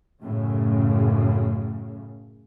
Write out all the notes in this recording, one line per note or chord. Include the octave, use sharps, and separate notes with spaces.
F#2 A2 C#3